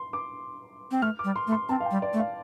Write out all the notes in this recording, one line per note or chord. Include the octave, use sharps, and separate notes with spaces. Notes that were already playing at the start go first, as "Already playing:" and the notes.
Already playing: C6
D6
C4
A3 F6
D6
G3
C6
A3
C6
C4 A5
F5
G5
G3
D5
A3
F5